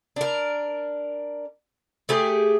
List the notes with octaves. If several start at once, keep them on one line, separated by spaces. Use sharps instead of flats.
D4 A#4
A3 G4 G#4